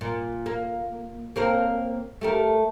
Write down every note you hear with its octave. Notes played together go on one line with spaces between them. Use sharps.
A#2
A#3
A#3 C4 A#4
A3 G4 A#4